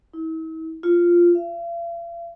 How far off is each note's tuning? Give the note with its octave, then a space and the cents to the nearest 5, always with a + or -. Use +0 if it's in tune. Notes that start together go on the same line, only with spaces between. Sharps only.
E4 -45
F4 -5
F5 -45